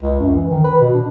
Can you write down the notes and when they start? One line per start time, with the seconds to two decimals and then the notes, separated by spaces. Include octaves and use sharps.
0.02 C#2
0.19 F#2
0.35 E3
0.51 D#3
0.64 B4
0.80 B2
0.94 D4